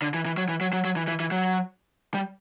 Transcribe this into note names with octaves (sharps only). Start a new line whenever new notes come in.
D3
E3
E3
F#3
E3
F#3
F#3
F#3
E3
E3
E3
F#3
G3